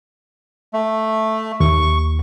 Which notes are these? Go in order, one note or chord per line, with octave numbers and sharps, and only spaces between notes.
A3
D#2 C#6